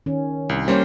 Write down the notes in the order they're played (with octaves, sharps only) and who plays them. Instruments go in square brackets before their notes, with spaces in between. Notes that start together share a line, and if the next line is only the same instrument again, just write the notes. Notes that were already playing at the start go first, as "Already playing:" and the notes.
[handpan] D#3 C#4
[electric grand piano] C2
[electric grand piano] G3 A#3 C#4 [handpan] C5 C#5